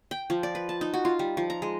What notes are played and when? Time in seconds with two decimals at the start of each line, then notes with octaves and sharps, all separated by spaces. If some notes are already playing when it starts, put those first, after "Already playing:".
0.11 G5
0.30 F3
0.43 D5
0.55 B4
0.69 A5
0.81 D#4
0.94 F#4
1.05 F4
1.19 G3
1.37 F3
1.50 A#5
1.62 G#3